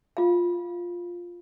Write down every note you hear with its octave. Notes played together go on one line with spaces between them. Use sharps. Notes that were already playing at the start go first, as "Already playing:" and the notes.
F4 F5